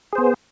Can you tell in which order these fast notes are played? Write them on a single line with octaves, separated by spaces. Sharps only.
G#4 C5 B3